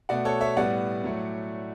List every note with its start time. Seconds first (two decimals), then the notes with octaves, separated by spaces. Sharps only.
0.09 B2 A3 D5 F#5
0.25 A4 C#5
0.41 C#5 E5
0.56 A2 G3 B3 D5 F#5
1.04 A2 F#3 A3